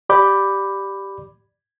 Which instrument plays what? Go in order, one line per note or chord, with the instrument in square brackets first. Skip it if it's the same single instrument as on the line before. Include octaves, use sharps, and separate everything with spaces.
[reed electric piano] G4 D5 B5 D6 G6